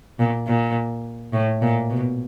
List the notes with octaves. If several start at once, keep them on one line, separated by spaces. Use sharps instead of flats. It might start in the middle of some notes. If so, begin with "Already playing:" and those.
A#2
A#2
A2
A#2
B2